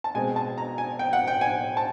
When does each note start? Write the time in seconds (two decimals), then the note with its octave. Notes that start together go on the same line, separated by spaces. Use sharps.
0.04 A5
0.14 B2 G#3 C4 G#5
0.36 A5
0.58 A#5
0.78 G#5
0.99 G5
1.13 F#5
1.28 G5
1.41 G#5
1.77 A5